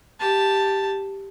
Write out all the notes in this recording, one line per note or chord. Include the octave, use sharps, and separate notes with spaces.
G4 A5